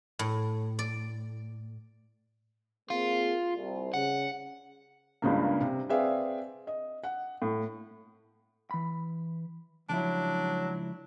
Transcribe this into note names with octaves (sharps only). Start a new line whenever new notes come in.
A2
D5
A#3 C4 F4 G#4
C2
C#3 F#5
C#2 G2 C#3 A#3
C3
C4 G#4 B4 D5 E5 F5
D#5
F#5
A2
E3 B5
C#2 F3 F#3 D4 E4